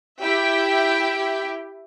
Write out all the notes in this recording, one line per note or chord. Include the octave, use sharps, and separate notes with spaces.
E4 G4 E5 G5